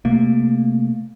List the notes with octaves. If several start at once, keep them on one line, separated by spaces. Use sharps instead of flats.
C3 A3 A#3